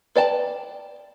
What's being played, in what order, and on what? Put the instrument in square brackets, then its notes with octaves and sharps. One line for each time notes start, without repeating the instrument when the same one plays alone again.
[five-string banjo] B4 D5 G5 A5